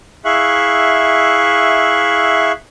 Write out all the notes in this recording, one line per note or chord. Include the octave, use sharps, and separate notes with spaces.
E4 G#4 E5 F5 C#6 F#6